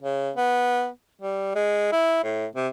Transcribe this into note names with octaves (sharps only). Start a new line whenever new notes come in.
C#3
B3
G3
G#3
E4
A2
C3